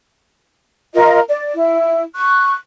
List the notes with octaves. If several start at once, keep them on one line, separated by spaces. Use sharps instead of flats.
F4 A#4 D#5
D5
E4
C#6 F#6